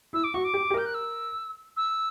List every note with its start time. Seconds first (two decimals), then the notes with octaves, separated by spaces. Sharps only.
0.13 E4 E6
0.24 D6
0.34 F#4 C#6
0.44 D6
0.54 G4
0.70 G4
0.74 A#4 G6
0.86 F#6
0.94 E6
1.77 E6